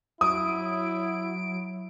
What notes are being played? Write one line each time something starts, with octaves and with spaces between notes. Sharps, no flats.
F#3 E4 D#6 D7